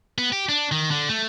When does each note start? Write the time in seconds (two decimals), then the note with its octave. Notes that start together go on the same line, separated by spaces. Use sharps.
0.18 B3
0.33 G4
0.49 D4
0.72 D#3
0.91 D3
1.09 A3